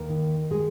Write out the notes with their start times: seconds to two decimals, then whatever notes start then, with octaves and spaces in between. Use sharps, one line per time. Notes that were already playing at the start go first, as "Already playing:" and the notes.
Already playing: D#2 A#4
0.10 D#3
0.51 G#3 G#4